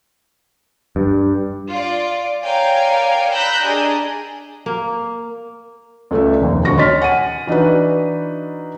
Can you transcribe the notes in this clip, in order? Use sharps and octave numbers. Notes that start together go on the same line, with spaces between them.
G2
F4 D5
A#4 C#5 D5 F5 G5 G#5
A#5 B5 E6 F#6 G6 A#6
D4 G4 G#4 A#4 D5 D#5
A#3
C#2 A3 A4 D5 E5
F1 D#2
D#1 D2 F#4 C#6 A#6
C#5 D#5 C6 F6 A6 B6
F#5 G#5 D#7
E3 D4 D#4 F#4 B4